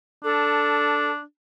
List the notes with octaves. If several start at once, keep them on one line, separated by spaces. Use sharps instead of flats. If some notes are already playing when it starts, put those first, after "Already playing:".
D4 A4